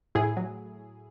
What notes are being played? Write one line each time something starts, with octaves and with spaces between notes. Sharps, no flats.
A2 E4 G#4
F#3